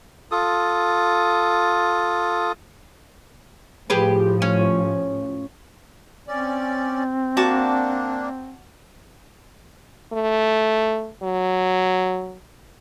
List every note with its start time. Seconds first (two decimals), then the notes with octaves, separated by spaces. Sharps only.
0.31 F4 A4 D#6
3.90 A2 F3 G4 G#4 B4
4.42 C#4
6.28 C4 C#4 D5
7.37 A#3 D4 F#4 A5 D6
10.13 A3
11.23 F#3